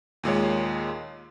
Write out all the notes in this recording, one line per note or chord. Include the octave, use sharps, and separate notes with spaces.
D#2 A#2 G#3 C#5